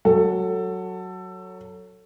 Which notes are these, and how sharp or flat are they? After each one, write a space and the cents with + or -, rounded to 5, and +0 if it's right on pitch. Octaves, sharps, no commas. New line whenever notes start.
F#3 +0 A4 +15